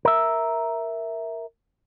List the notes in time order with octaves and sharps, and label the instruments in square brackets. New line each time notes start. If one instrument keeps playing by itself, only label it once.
[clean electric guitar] A#4 E5